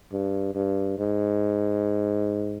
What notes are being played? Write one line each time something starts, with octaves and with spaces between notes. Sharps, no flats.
G2
G2
G#2